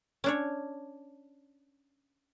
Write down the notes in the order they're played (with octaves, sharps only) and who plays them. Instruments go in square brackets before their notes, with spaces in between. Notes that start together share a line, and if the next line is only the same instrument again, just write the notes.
[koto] C#4 D4 C#5